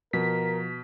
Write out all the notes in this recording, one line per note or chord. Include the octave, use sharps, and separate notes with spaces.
B2 F3 A#4 B6